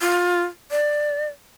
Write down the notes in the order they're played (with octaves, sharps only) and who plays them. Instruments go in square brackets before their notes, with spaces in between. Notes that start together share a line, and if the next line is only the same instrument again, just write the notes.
[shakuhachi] F4
D5